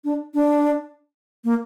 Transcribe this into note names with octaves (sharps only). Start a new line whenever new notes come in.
D4
D4
A#3